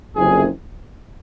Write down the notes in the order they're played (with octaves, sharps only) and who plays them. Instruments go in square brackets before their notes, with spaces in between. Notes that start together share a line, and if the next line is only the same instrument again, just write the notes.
[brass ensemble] F#1 F2 C3 G#4